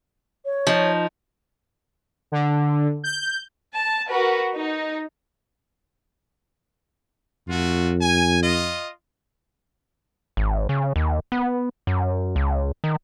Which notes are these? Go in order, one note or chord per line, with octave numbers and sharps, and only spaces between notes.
C#5
F3 D#4
D3
G6
A5
F#4 A#4 B4
D#4
F2 A3 F4 F#4
G#5
F4 D#5
G#1
C#3
D#2
B3
F#2
C#2
D#3